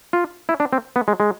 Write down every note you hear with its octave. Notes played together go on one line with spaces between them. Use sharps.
F4
E4
D4
C4
B3
G#3
G#3